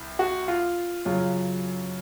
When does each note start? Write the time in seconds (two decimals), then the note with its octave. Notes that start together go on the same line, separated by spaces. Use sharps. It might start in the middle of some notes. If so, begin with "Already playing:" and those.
Already playing: C2
0.19 F#4
0.48 F4
1.05 F#2 C#3 F#3 F4